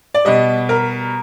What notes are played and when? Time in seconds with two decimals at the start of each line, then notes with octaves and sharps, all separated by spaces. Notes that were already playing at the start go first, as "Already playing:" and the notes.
0.14 D5
0.25 B2 G3 D#5
0.69 A#4